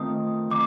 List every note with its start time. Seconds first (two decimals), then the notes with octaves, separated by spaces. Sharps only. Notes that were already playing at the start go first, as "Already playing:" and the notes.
Already playing: D#3 A3 C4 F4 D#6
0.50 D#3 D6